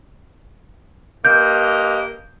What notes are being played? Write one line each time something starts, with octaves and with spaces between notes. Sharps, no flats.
G2 A#3 D#5 G6